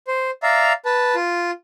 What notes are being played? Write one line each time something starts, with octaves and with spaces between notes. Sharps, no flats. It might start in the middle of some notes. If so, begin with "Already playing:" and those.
C5
D5 E5 F5 A#5
B4 A5
F4